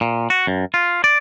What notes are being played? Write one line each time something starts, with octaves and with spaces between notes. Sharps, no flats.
A#2
F#4
F#2
F4
D5